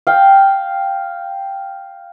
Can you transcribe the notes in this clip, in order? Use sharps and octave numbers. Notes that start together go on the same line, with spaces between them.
F5 G5